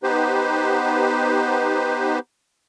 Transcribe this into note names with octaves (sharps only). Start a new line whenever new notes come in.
B3 D#4 G4 B4 C5